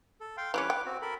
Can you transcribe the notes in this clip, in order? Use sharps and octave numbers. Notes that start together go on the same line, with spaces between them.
A4
F5 G5 C6
E3 G3 C#4 B4 D6
G5
C4 F#4
A4 A#4 B5